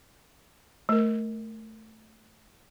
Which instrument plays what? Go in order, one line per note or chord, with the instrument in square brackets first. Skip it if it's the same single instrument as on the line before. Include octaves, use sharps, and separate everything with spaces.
[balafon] A3 A#4